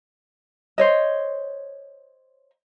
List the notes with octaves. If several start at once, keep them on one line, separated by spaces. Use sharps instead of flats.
C5 C#5 D#5